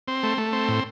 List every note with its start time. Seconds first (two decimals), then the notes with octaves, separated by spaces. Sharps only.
0.08 C4
0.23 A3
0.38 A3
0.53 C4
0.68 A2